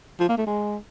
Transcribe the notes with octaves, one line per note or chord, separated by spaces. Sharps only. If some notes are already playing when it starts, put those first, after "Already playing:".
F3
A#3
A3
G#3